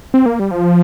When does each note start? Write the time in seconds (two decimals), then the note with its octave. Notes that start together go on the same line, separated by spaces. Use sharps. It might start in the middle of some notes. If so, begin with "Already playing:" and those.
0.14 C4
0.26 A#3
0.39 G3
0.51 F3